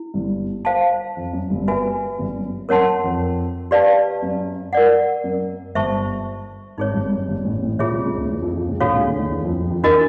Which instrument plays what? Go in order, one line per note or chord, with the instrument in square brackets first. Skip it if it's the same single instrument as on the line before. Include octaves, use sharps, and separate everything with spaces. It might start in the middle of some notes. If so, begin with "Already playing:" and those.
Already playing: [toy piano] E4
[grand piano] G1 G2
[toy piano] C5 F5 A5
[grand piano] F2
F#2
G1 G2
[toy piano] F#4 B4 E5 G#5
[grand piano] G1 G2
F#2
[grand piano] F#2 [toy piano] A#4 C#5 F#5 A5 C6
[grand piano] F2
[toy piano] G4 B4 D5 F5 A5
[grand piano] F#2
[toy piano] A#4 D5 F#5
[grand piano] F#2
[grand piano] G1 G2 [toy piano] C5 E5 A5 C#6
[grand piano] G#1 G#2 [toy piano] D#4 G#4 C#5
[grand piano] G1 G2
F#2
G1 G2
A1 A2
A1 A2
[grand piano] A#1 A#2 [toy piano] F4 G#4 C#5 E5
[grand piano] C2 C3
C#2 C#3
D2 D3
E2 E3
F2 F3
F2 F3
C#2 C#3
[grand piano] A#1 A#2 [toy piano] D4 F#4 A4 C#5 F5
[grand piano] C#2 C#3
D2 D3
D#2 D#3
E2 E3
F2 F3
F2 F3
F2 F3
[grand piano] E2 E3 [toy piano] D4 F#4 A#4 D#5